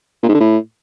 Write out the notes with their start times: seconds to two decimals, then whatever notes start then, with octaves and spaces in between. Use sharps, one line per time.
0.23 A#2
0.29 G#2
0.35 D3
0.40 A2